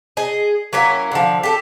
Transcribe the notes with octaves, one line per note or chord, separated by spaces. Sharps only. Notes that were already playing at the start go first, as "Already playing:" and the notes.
G#4 D#5
F#3 A#3 C#4 E4
D3 F3
G4 A4